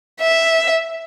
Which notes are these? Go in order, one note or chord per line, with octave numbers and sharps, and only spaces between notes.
E5